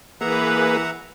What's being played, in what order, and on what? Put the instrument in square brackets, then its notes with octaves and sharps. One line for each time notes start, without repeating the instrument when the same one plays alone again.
[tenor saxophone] E3 [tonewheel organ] A#3 G#4 [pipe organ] B4 [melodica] E5 F#5 A#5